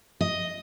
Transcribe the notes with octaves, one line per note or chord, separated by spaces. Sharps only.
D#5